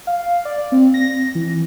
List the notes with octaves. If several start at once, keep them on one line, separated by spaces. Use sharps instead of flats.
F5
D5
C4
A#6
E3